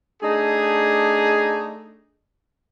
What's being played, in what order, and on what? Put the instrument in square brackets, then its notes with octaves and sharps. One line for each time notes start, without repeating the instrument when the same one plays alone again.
[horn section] A3 D4 D#4 G#4